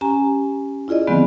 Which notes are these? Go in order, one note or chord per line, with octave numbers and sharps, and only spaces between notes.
C#4 G4 G#5 A#5
E4 F4 G#4 D5 D#5
D3 D#3 F3 G#3 B3 C4